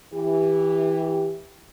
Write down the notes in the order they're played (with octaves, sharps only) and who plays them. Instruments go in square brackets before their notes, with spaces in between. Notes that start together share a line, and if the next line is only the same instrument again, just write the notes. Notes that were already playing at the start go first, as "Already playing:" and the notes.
[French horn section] E3 G4